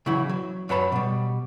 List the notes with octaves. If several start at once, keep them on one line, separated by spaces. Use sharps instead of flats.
C#3 E3 F#3 E4
F#3
F#2 F#3 B4 C#5 A5 B5
B2 G3